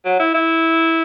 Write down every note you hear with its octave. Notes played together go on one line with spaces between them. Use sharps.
F#3
E4
E4